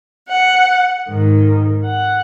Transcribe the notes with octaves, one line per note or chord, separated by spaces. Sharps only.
F#5
G#2 D#3
F#5